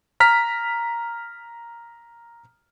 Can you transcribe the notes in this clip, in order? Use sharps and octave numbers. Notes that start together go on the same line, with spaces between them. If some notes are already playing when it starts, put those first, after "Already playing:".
A#5 F6 B6